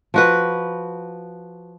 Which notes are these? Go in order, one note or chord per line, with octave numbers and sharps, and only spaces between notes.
F3 F#4 B4